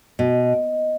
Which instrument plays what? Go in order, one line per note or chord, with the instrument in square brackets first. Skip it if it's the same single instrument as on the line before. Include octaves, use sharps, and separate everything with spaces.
[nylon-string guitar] B2 [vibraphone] D#5